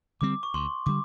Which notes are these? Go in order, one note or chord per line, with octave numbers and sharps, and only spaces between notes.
D3 G3 C4 D6
C#6
D2 C6
D3 G3 D6